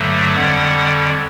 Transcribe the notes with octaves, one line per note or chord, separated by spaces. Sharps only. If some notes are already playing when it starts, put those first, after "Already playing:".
Already playing: G2 D3 F#3 A3
F2 D3 G3 F#5